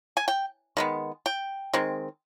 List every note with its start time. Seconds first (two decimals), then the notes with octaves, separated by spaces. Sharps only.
0.17 G#5
0.28 G5
0.77 D#3 G#3 B3
1.26 G5
1.73 D#3 G#3 C4